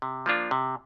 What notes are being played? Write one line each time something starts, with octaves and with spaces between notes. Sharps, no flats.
C3
F3 A#3 D4 F4
C3